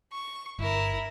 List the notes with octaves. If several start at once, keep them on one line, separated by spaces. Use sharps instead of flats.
C#6
G1 E4 A#4